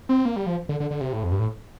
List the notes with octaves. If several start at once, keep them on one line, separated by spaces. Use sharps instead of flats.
C4
A#3
G3
F3
D3
D3
D3
C3
A2
F2
G2
A2